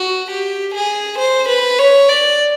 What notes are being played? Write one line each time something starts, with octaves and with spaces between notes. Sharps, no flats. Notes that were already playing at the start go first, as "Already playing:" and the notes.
Already playing: F#4
G4
G#4
C5
B4
C#5
D5